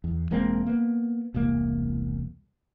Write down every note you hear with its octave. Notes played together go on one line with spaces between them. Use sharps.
E2
E1 G#3 A#3 C4
A#3 B3
E1 C2 A#3